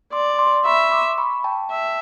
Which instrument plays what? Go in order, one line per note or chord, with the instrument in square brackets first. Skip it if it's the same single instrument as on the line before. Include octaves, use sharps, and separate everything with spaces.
[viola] D5 [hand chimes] C6 D6
[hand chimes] C6 D6
[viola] E5 [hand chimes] B5 C#6
[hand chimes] C6 D6
B5 C#6
G5 A5
[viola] E5